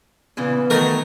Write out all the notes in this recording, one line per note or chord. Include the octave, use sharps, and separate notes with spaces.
A#2 C#3 E3 B3
D#3 F#3 A3 A#4 A#5